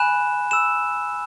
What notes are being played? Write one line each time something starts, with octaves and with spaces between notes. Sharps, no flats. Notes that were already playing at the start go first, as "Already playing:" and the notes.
Already playing: G#5 B5 F#6 E7
B5 E6 E7